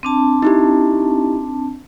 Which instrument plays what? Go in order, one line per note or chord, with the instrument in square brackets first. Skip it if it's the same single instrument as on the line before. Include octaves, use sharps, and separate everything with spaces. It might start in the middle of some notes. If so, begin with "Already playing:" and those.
[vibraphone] C4 D4 A5
[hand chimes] D#4 E4 G4